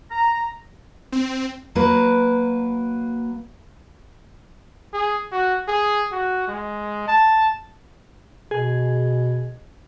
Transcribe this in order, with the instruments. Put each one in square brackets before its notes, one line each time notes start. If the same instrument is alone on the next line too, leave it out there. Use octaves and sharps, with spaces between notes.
[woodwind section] A#5
[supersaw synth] C4
[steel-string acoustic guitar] F#3 A#3 B4
[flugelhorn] G#4
F#4
G#4
F#4
G#3
A5
[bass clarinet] B2 [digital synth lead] G#4